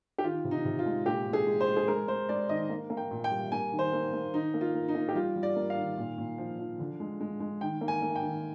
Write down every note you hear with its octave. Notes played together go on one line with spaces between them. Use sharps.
G4
D#3 F4
C3
D#4
C3
F4
G#3
A#2 G4
A#2
G#4
G#3
C5
G#3
G#4
G#3 A#4
G#3 C5
G#3 D5
D#3 D#5
A#3
A#3
G5
A#2
G5
G3
A#3 G#5
D#3
C5
A#3
A#3
D#3 D#4
A#3
F4
A#3
D#4
A#3
G4
G3 F4
G3
D5
A#3
F5
D#3
A#2
A#2
F3
F3
D3
G#3
G#3
G#3
D#3 G5
A#3
G#5
A#3
G5
D#3